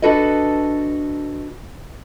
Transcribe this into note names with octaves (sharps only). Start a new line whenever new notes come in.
D4 F#4 A4 B4 D#5